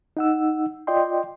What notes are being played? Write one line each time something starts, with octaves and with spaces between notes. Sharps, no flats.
D#4 F#5 E6
F4 D5 D#5 G5 C6